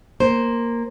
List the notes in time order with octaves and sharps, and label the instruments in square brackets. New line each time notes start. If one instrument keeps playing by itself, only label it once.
[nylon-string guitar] A#3 C5